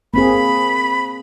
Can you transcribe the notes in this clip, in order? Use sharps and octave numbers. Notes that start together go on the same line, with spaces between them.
A#3 C4 G#4 B5